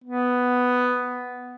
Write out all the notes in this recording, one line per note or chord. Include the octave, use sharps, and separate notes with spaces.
B3